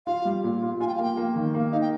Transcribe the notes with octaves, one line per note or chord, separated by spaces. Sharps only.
F4 F5
G3
A#2
F4
F4 G#5
G5
F5
A#3 G5
A#3
D#3
A#3
D#4 F5
G5